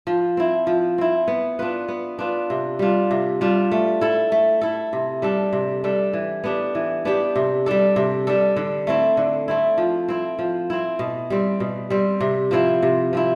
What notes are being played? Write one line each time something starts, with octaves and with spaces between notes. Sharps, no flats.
F3
C4 E4
F3
C4 E4
B3
D4 F4 B4
B3
D4 F4 B4
C3
G3 D4 F4
C3
G3 D4 F4
A3
E4 A4
A3
E4 A4
C3
G3 D4 A4
C3
G3 D4 A4
E3
B3 D4 G4
E3
B3 D4 G4
C3
G3 D4 A4
C3
G3 D4 A4
D3
A3 C4 E4
D3
A3 C4 E4
F3
C4 E4
F3
C4 E4
B2
G3 C4
B2
G3 C4
C3
F3 C4 E4
C3
F3 C4 E4